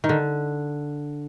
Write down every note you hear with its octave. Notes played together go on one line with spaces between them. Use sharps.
D#3
D3